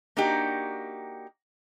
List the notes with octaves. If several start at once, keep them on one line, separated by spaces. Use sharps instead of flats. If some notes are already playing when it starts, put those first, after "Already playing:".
A#3 D4 D#4 F#4 G4